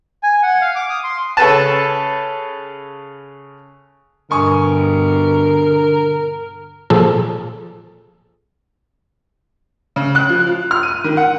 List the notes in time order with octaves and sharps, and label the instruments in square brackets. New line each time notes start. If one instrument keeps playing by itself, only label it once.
[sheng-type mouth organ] G#5
F#5
F5
D6
D#6
C6
[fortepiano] C#3 A4 B4 A5
[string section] G2 B2 [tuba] D3 [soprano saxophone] A#4 [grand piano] G#5 C#6 D#6
[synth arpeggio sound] A#2 F3 G#4 A4
[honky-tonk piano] C#3
F#6
F3
F4
F6
D#7
D#3
F#5